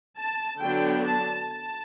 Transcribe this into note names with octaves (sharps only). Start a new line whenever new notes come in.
A5
D3 F#3 B3 D4 G5
A5
A5